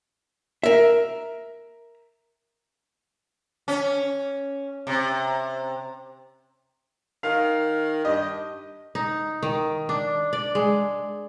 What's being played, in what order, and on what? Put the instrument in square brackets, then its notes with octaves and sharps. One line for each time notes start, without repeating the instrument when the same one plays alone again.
[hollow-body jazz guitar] A#4 E5
[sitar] C#4
C3
[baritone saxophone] D#3 [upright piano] F5 F6
[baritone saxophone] G2 [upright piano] D#5
[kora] D#4
D#3
D4
D5
G#3